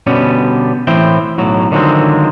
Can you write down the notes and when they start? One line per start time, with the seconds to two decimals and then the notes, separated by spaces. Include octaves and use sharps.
0.07 B2 D3 G3 B3 C#4
0.87 A2 E3 C4 E4 G5
1.38 B1 A2 F#3
1.71 D3 D#3 F3 F#3 G#3 C4